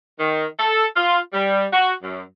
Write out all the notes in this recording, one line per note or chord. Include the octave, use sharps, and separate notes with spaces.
D#3
A4
F4
G3
F#4
F#2